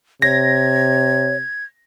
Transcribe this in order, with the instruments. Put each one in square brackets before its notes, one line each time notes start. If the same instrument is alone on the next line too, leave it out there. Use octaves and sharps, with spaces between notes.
[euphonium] C3 [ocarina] C#5 [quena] G#6 [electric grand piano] A#6